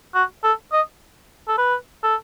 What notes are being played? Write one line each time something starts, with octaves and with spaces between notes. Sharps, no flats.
F#4
A4
D#5
A4
B4
A4